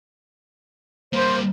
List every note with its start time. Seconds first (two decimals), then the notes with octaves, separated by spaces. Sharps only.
1.13 G3 A#3 C5